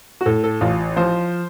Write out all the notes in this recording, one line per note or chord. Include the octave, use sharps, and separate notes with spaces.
F#4
A2 A4
A4
A1 F4
F3 C5